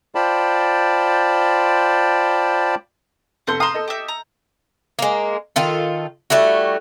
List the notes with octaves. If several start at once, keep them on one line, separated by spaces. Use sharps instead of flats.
F4 C5 D5 G5 A5 B5
F1 A4 F#5 C6 G6
F5 A#5 C6 D#6 E7
A4 D#5
G4 E5
A#5
G#3 A#3
D#3 F4 A4
G3 A3 E4 F#4